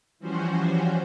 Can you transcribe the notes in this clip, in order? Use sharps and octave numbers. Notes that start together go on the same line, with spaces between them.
E3 F3 G3 C#4 F#4 C5